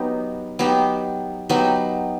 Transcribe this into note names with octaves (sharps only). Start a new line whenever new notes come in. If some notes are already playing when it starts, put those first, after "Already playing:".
Already playing: F#3 B3 D#4 G4
F#3 B3 D#4 G4
F#3 B3 D#4 G4